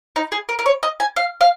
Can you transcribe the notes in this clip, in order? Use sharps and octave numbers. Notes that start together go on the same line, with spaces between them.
D#4
G#4
A#4
A#4
C#5
D#5
G#5
F5
F5